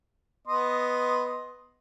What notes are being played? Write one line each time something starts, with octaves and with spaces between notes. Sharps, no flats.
B3 D#5 C6